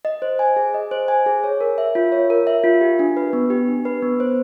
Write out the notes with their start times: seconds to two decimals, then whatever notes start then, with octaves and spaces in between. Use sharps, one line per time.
0.05 D#5
0.22 C5
0.39 G#5
0.56 G#4
0.74 D#5
0.91 C5
1.08 G#5
1.26 G#4
1.44 C#5
1.61 A#4
1.78 E5
1.95 F4
2.12 C#5
2.30 A#4
2.47 E5
2.64 F4
2.81 G4
2.99 D4
3.17 B4
3.33 B3
3.50 G4
3.68 D4
3.85 B4
4.02 B3
4.20 C5